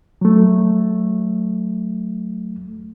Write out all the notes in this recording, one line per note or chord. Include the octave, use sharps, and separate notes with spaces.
F#3 A3